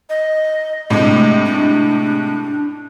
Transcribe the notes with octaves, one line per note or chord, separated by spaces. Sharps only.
D#5
A2 C3 G#3 D4
D4